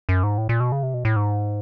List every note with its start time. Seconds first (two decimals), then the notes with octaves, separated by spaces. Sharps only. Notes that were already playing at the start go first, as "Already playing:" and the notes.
0.09 F#2
0.24 G#2
0.38 A2
0.49 A#2
0.60 B2
0.72 C#3
0.83 C3
0.94 B2
1.05 A2
1.16 G#2